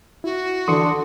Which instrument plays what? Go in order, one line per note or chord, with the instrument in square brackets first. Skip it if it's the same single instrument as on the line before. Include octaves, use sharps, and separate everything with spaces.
[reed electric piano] E4 [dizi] F#4
[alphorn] D3 [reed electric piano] E3 D#6 [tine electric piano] C6 C#7